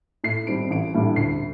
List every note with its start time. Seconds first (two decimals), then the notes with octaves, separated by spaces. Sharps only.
0.24 A2 C7
0.47 G3 C4 D#4 D7
0.70 A1 D7
0.94 A2 G3 D4
1.16 D2 C7